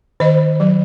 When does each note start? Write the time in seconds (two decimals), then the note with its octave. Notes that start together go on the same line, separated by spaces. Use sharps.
0.20 D#3 C5 D#5
0.60 F#3